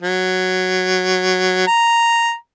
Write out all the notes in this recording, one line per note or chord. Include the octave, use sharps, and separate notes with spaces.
F#3
A#5